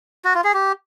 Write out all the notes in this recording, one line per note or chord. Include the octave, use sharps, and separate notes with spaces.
F#4
F4
G#4
G4